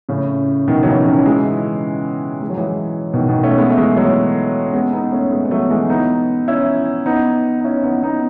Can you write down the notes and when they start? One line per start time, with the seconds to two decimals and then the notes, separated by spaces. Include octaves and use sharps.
0.09 A2 C#3
0.68 B2 D#3
0.83 F#3
0.86 C#3 E3
1.06 D#3 F#3
1.26 E3 G#3
2.41 G#3
2.50 F#3
2.57 E3 G#3
3.14 B2 D#3
3.29 B2 D#3
3.43 A3 C#4
3.58 G#3 B3
3.70 A3
3.77 E3 G#3
3.96 F#3 A3
4.65 C#4
4.74 G#3 B3
4.93 B3 D#4
5.12 A3 C#4
5.32 G#3 B3
5.45 B3
5.51 F#3 A3
5.70 E3 G#3
5.90 B3 D#4
6.48 C#4 E4
7.06 B3 D#4
7.60 D#4
7.64 C#4 E4
7.84 B3 D#4
8.03 B3 D#4